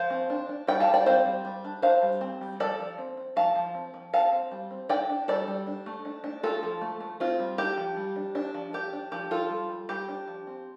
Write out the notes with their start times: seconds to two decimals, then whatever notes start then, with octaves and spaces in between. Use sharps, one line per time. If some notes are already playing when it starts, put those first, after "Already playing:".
Already playing: F3 C5 F5
0.10 C4
0.30 D4
0.49 D4
0.67 G3 D5 G5
0.80 F5 A5
0.88 G3
0.94 D5 G5
1.06 C4 C5 F5
1.26 G3
1.45 G3
1.64 D4
1.82 D4 C5 F5
2.02 G3
2.21 C4
2.41 G3
2.59 F3 A4 D5
2.79 F3
2.98 C4
3.17 C4
3.36 F3 F5 A5
3.55 F3
3.75 C4
3.94 F3
4.13 C4 F5 A5
4.32 C4
4.51 G3
4.71 C4
4.89 D4 D5 G5
5.10 D4
5.28 G3 A4 D5
5.47 G3
5.67 D4
5.86 A3
6.05 D4
6.24 D4
6.43 A3 F4 A4
6.63 F3
6.81 A3
7.00 A3
7.20 C4 F4
7.40 G3
7.58 D4 G4
7.78 F3
7.97 G3
8.16 D4
8.35 D4
8.54 F3
8.73 D4 G4
8.93 D4
9.12 F3 G4
9.31 F3 F4 A4
9.50 G3
9.69 G3
9.89 G3 G4
10.08 D4
10.28 F3
10.47 C4